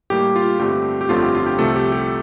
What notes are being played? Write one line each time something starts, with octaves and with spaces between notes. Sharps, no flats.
A2 G3 A#3 G4
F4
G2 D3 A3 C4 G4
G4
G1 F2 D3 A3 C4 F4
G4
F4
G4
C2 C3 F3 A3 A4
G4
G4